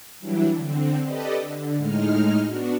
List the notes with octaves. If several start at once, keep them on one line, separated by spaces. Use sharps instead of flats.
E3 F#3 G3 D4 E4
D3 C4
G4 A4 B4 D5 D#5
D3
A2 G#3 D#4 F6
B3 D4 F#4